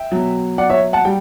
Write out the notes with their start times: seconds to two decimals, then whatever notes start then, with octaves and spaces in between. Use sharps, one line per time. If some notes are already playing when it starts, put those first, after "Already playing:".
Already playing: E5 G5
0.12 B2 F#3
0.58 D5 F#5
0.70 C#5 E5
0.93 F#5 A5
1.05 G3 G5